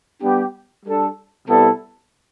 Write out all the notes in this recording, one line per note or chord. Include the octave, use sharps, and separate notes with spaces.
G3 B3 D4 G4
G3 D4 A4
C3 G3 B3 E4 A4